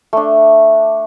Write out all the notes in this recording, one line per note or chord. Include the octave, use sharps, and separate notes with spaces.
A3 D4